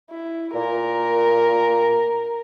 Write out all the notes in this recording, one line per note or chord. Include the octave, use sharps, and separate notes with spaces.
E4
A#2 A#4